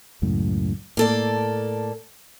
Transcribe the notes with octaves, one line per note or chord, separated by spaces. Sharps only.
C#2 F#2 A2
A2 A#3 A4 D5